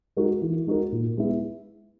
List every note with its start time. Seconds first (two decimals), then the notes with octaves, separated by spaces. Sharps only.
0.17 G#3 D#4 F#4 A#4
0.42 E3
0.67 G#3 D#4 F#4 A#4
0.92 A#2
1.17 G#3 B3 E4